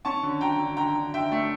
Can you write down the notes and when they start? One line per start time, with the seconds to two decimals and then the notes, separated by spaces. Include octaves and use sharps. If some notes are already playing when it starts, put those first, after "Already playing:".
0.05 C#4 A5 C#6
0.23 D3
0.41 D3 G5 A#5
0.59 D3
0.77 D3 G5 A#5
0.95 D3
1.14 D3 E5 G5
1.32 A3